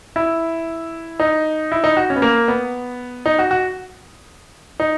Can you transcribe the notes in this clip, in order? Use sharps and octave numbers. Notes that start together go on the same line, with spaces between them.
E4
D#4
E4
D#4
F#4
C#4
B3
A#3
B3
D#4
F#4
F#4
D#4